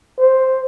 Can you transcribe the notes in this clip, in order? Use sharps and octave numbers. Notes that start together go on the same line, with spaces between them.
C5